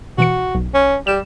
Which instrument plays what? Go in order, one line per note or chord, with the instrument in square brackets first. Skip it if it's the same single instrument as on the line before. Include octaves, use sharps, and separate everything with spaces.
[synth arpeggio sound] B2 E3 C#7 [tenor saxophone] F#4
[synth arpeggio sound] B1
[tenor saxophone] C#4
[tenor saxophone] G3 [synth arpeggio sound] E7